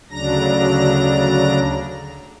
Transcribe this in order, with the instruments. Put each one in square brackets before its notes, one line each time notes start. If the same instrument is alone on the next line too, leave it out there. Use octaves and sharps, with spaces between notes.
[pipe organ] D2 C#3 F#3 D4 A#5 A#6